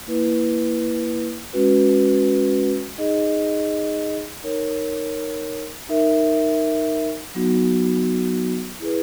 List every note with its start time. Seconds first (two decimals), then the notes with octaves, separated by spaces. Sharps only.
0.07 A#3 E4 B4
1.53 G#3 C#4 F#4 B4
2.98 D#4 G#4 D#5
4.43 D#4 A#4 C#5
5.89 D#4 A#4 E5
7.35 F#3 B3 D#4 F#4
8.80 E4 G#4 B4